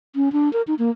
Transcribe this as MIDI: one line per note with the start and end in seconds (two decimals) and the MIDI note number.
0.16 0.32 61
0.32 0.51 62
0.53 0.62 70
0.67 0.75 63
0.79 0.90 58